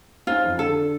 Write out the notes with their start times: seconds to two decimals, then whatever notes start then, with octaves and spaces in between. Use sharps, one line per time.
0.27 C#4 D#4 F4 C5
0.45 F2 F3
0.59 D3 A4